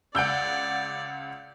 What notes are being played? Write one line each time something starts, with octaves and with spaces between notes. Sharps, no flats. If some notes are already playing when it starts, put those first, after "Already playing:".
C#2 D5 F#5 E6 G6 D7